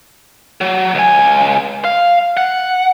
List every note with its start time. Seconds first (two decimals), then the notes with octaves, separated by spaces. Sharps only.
0.61 F#3
0.95 C#2 G#5
1.84 F5
2.37 F#5